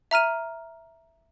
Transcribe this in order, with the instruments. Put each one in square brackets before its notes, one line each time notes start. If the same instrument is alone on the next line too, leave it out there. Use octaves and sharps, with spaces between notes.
[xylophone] E5 A#5 F6 D#7